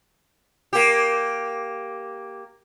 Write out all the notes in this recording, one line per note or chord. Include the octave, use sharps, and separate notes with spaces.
A#3 G4